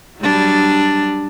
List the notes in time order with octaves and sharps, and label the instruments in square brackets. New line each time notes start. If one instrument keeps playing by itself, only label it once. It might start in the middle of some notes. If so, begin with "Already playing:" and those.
[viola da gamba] F#3 G3 D4